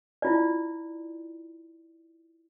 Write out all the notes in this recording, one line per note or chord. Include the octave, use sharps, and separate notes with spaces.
E4 F4 D5